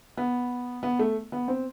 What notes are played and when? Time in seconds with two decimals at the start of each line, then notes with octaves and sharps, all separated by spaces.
0.17 B3
0.83 B3
0.99 A3
1.32 B3
1.48 C4